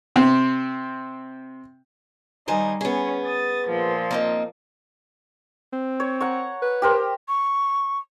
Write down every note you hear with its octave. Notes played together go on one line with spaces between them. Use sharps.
C3 C4
D#3 G3 D#4 C5 G#5
B3 C#4 G#4
D#6 A6
A#2 F3
A#3 C4 D#4
C4
C#5
F#5 A#5 C#6
B4
G4 A#4 C5
C#6